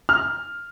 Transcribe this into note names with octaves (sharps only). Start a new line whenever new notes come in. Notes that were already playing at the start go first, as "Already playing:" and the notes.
F6